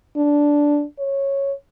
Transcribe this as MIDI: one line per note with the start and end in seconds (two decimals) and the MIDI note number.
0.17 0.84 62
0.99 1.52 73